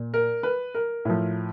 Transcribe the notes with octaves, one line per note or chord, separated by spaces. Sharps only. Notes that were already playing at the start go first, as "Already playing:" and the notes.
Already playing: A#2
A#4
B4
A#4
A2 F3